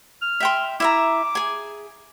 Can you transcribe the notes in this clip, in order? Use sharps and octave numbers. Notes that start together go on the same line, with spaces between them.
F6
E5 G5 C6
E4 E5 A#5 D6
G#4 G#5